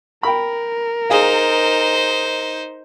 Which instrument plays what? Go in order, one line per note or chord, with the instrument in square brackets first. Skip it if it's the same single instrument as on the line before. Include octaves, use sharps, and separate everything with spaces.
[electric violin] A#4 [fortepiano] G5 B5
[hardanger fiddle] D#4 C5 [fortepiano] G#4 F5